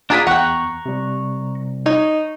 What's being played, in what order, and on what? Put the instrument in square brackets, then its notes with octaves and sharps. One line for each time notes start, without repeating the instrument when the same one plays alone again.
[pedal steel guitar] D4 F4 B4 [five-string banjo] G#4 G#5 A#5
[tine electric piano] E2 [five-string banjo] F#5 G5 [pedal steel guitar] A#5 C#6 F#6
[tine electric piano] C3 G3
[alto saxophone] D#4 [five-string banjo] C#5